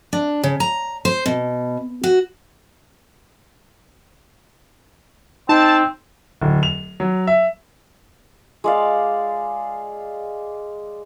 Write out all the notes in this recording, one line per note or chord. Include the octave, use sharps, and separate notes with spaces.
D4
C#3
A#5
C5
B2
F#4
C4 D#4 A5
D1
F7
F#3
E5
G#3 D5 F5